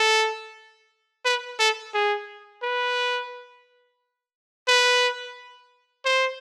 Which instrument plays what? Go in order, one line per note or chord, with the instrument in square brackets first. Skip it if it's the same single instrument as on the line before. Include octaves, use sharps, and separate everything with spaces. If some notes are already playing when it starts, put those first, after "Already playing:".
Already playing: [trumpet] A4
B4
A4
G#4
B4
B4
C5